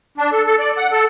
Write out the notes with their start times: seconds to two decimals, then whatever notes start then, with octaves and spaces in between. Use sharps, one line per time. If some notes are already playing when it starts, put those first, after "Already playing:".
0.18 D4
0.33 A4
0.47 A4
0.59 D5
0.77 F#5
0.92 A4